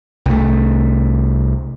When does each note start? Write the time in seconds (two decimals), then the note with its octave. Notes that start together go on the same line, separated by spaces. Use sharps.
0.26 C2 A3